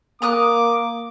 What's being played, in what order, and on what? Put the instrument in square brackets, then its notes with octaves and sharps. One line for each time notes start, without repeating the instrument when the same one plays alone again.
[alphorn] A#3 [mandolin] A#5 D#6 F#6 [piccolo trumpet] D6